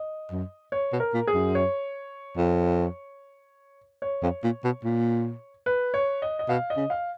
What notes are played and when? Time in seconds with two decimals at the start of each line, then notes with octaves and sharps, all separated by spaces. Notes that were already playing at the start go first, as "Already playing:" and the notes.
Already playing: D#5
0.31 F#2
0.72 C#5
0.93 B2
1.00 A#4
1.14 A#2
1.28 G#4
1.34 F#2
1.55 C#5
2.37 F2
4.02 C#5
4.22 F2
4.44 A#2
4.64 B2
4.84 A#2
5.66 B4
5.94 C#5
6.22 D#5
6.39 D#5
6.49 B2 F5
6.70 D#5
6.76 C#3
6.90 F5